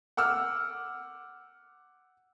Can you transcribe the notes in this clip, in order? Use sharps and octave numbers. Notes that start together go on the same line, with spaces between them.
F#5 D6 E6 F6